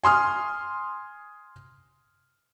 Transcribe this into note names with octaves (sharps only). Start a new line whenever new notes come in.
G#5 C6 D#6 F6